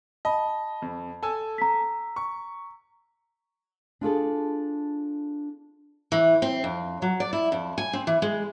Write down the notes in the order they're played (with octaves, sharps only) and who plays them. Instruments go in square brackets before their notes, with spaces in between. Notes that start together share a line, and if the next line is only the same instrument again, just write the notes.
[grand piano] D#5 [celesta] A5 B5
[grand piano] F2
A4 G#5 E6
[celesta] A#5 B6
[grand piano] C#6
[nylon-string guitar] D4 F4 G#4 A4
[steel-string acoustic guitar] E3
C4
F2
F#3
D5
E4
F2
G#5
C4
E3
G#3